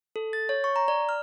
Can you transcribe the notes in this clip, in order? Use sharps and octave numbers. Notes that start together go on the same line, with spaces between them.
A4
A6
C#5
C#6
A#5
D5
F6